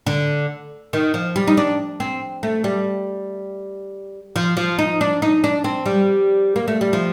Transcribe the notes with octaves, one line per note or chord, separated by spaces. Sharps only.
D3
D#3
F3
G3
D#4
D4
C4
A3
G3
F3
F3
D#4
D4
D#4
D4
C4
G3
A#3
A3
G3
F3